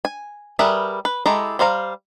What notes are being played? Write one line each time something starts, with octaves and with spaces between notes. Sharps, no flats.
G#5
G3 G#4 A#4 B4 E5
B4
G#3 E4 G4 A4 A#5
G3 C5 F5 A#5